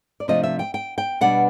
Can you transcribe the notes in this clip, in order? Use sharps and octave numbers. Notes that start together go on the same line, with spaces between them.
D5
C3 F3 A3 D4 F4 D#5
E5
G5
G5
G5
B2 G3 B3 D4 F#5